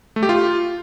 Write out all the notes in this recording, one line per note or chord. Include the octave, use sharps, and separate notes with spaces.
A3
G4
F4